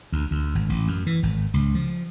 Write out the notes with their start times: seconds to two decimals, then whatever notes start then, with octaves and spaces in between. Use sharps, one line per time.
0.12 D2
0.31 D2
0.55 G#1
0.69 A1
0.88 F#2
1.07 E3
1.23 G#1
1.54 C#2
1.75 F3